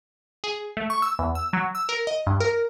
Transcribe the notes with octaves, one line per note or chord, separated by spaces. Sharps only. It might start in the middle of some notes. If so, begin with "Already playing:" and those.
G#4
A3
C#6
E6
E2
E6
F#3
E6
A#4
D#5
G2
A#4